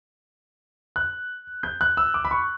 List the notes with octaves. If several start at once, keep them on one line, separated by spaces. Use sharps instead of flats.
F#6
G6
F#6
E6
D6
B5
C#6